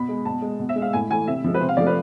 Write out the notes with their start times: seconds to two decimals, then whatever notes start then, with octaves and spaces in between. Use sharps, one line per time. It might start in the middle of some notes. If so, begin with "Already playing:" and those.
Already playing: B2 B5
0.09 G#3
0.25 B2 A5
0.42 G#3
0.59 B2
0.69 E5
0.76 G#3
0.82 F5
0.93 A2 G#5
1.10 E3 A3 G#5
1.27 C3 E5
1.44 F3 G#3
1.54 B4
1.60 C3 C5
1.69 F5
1.77 F3 A3 D5
1.87 B4